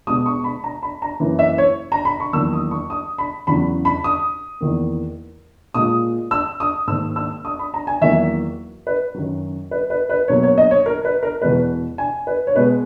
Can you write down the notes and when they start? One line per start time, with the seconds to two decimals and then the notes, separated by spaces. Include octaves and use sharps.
0.07 G#3 D#6
0.10 B2
0.26 C#6
0.44 B5
0.64 A#5
0.83 B5
1.02 A#5
1.20 F#2 E3 A#3
1.39 E5
1.58 C#5
1.92 A#5
2.05 B5
2.20 C#6
2.33 E2 D#3 F#3 A#3 E6
2.53 D#6
2.71 C#6
2.90 D#6
3.18 B5
3.47 E2 C#3 F#3 B5
3.85 B5
4.04 D#6
4.61 E2 D#3 A#3
5.74 A#2 G#3 D#6
6.31 E6
6.60 D#6
6.87 G#2 D#3 A#3 E6
7.16 E6
7.45 D#6
7.59 B5
7.74 A#5
7.87 G#5
8.01 E2 D#3 F#3 A#3 E5
8.87 B4
9.15 F#2 D#3 F#3
9.71 B4
9.90 B4
10.10 B4
10.28 B2 F#3 A#3 C#5
10.43 C#5
10.58 D#5
10.71 C#5
10.86 A#4
11.05 B4
11.23 A#4
11.42 E2 B2 G#3 B4
11.98 G#5
12.27 B4
12.47 C#5
12.56 B2 G#3 B4